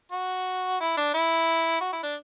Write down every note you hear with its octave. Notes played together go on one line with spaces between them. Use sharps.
F#4
E4
D4
E4
F#4
E4
D4